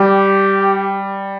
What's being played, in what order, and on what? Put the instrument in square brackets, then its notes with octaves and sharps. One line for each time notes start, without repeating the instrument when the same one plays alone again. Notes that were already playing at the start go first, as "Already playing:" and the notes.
Already playing: [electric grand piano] G3 [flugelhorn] G4